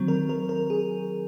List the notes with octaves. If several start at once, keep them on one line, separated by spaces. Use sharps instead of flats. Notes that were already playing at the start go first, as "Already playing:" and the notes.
Already playing: D#3 F#3 C4
A#4
A#4
A#4
G#4